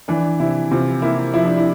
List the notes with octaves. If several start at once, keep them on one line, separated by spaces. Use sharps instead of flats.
E3 D4
C3 E4
C3 F4
A#3 E4
F3 E4
D4
E4